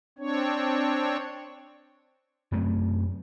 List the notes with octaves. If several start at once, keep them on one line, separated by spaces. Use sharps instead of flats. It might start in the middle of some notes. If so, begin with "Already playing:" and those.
C4 D4 C#5
F#2 A3 C4